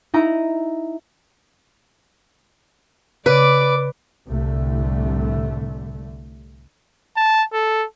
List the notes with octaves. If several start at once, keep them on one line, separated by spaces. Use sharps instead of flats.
D#4 E4 A#5
C#3 B4 D5 D6
C2 A2 D3 A3
A5
A4